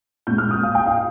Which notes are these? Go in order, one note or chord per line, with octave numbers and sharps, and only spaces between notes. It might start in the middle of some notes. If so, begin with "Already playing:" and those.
A#2 G#3 G6
F6
D#6
F5
G5
F5